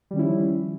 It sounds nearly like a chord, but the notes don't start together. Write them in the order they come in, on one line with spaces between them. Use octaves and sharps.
G3 D#3 C#4 E4 F3